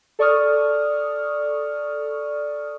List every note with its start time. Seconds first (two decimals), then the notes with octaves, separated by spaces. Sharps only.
0.19 A4 D5 C#6 D#6 F6